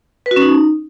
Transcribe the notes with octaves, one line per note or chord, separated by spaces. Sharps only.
B4
F#4
C#4
D#4